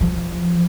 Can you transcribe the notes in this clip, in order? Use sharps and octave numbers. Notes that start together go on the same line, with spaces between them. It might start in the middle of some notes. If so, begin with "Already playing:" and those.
F3